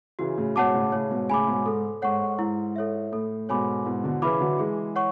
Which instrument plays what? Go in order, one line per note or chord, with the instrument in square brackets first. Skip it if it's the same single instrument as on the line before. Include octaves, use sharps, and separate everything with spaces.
[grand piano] C#3 E3 [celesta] F#4
[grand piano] A2 C#3
[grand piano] G#2 B2 [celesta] C#5 F#5 A5 D6
[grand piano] A2 C#3
[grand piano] A2 C#3 [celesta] C#5
[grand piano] G#2 B2
[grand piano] A2 C#3 [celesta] G#5 B5 D6
[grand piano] G#2 B2
[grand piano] G#2 [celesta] A4
[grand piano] G#2 [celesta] C#5 F#5 C#6
[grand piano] G#2
[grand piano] G#2 [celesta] E4
[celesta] A4 C#5 E5
[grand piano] A2 [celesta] A4
[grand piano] G#2 B2 [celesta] C#5 G#5 B5 D6
[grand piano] G#2 B2 [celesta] E4
[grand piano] B2 D3
[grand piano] C#3 E3 [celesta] B4 E5 B5 D6
[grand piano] D3 F#3
[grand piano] E3 G#3 [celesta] G#4
[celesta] C#5 F#5 C#6